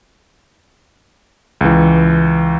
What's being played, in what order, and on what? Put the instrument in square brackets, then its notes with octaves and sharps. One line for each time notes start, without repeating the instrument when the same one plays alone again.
[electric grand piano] C#2 E3